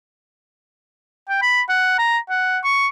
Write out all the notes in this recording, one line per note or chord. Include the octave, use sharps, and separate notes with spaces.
G5
B5
F#5
A#5
F#5
C#6